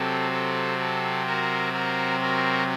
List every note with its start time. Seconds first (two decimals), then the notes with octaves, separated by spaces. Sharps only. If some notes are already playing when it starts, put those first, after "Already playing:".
Already playing: C3 F#3 C4 A4
0.32 A4
0.80 A4
1.26 F#4 A#4
1.73 F#4 A#4
2.21 F#4 A#4